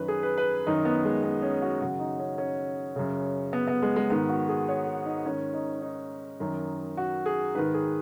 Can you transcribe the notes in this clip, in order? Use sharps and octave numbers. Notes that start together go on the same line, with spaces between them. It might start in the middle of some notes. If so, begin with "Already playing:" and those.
Already playing: F#2 D#3 B4
G#4
B4
B4
F#2 D#3 D#4
B3
G#3
B3
C#4
F#4
F#2 C#3 F#4
D#4
C#4
C#4
F#2 C#3
B3
B3
G#3
G#3
G#2 D#3 B3
F#4
G#4
C#5
G#4
D#4
G#2 D#3 C#4
D#4
D#4
F#2 D#3
F#4
G#4
G#2 D#3 B4
G#4